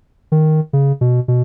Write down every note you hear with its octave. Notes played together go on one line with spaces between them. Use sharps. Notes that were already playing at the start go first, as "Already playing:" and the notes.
D#3
C#3
B2
B2